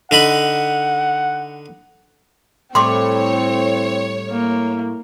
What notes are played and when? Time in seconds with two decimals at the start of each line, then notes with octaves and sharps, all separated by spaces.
0.11 D3 D#4 F#5 B5
2.75 A2 G3 C4 C#5 C6 D6
4.31 A#3